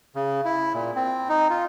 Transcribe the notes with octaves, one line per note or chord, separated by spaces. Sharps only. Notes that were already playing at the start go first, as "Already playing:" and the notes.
C#3
E4
A#2
C4
D#4
F4